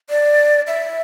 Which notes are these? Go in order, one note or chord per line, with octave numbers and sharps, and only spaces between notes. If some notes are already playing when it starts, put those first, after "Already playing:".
D5
E5